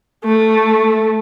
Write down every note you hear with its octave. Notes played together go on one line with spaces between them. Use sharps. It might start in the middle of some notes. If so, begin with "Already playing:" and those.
A3